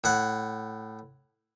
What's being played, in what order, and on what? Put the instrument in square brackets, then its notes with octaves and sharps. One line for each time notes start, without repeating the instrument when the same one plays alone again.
[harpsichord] A2 F#5